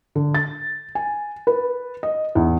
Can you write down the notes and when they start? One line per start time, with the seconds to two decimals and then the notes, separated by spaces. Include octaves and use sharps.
0.15 D3
0.35 A6
0.95 G#5
1.47 B4
2.03 D#5
2.35 E2